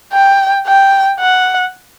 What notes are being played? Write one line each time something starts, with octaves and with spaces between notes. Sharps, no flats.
G5
G5
F#5